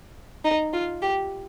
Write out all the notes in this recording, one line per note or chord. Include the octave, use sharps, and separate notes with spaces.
D#4
F4
G4